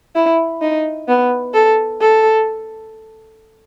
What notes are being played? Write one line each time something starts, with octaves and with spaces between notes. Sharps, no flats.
E4
D#4
B3
A4
A4